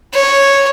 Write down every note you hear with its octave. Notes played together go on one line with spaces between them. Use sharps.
C#5